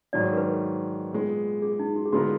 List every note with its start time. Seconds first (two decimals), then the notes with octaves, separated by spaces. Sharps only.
0.13 G#2 D#3 F#3 D4 D5
0.33 A#4
0.37 B4
1.13 A#2 G#3 B3
1.62 G#4
1.79 D#4
1.96 F#4
2.05 G#4
2.13 D3 G#3 B3 F4 F#4 A#4